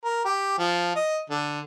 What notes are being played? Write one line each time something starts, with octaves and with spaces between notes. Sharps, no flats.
A#4
G4
F3
D#5
D3